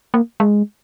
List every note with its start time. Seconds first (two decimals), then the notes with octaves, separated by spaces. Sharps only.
0.14 A#3
0.40 G#3